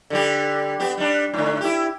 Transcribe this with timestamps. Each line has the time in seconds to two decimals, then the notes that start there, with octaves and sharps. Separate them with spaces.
0.10 D3 G3 G4
0.80 B3 G4
0.97 G3 D4
1.34 G#2 D3
1.61 E4 G4